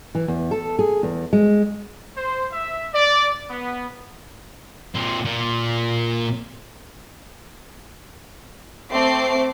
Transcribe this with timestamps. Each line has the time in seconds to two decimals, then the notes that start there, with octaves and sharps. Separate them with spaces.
0.15 E3
0.28 E2
0.51 A4
0.79 G#4
1.03 E2
1.33 G#3
2.16 C5
2.52 E5
2.93 D5
3.50 B3
4.95 A#2 C4
5.25 A#2
8.91 A3 C4 D6 C7